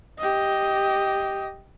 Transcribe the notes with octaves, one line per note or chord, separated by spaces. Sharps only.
G4 D#5